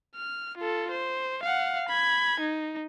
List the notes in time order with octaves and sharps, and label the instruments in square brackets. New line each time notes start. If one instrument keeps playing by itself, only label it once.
[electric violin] F6
F4 A4
C5
F5 F#5
B5 G#6
D#4